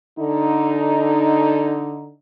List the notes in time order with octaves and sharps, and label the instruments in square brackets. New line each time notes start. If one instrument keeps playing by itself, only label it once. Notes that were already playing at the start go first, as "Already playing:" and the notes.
[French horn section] D3 D#4